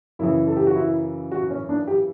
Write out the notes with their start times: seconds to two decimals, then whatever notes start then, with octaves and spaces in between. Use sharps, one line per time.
0.19 F#2 C#3 E3 E4
0.48 A4
0.56 G4
0.67 F#4
0.75 E4
1.32 F#4
1.51 C#4
1.69 D4
1.88 G4